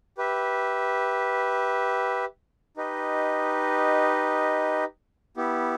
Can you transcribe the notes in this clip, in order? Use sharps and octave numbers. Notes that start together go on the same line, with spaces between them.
G4 B4 E5
D#4 G4 B4 D#5
B3 E4 G4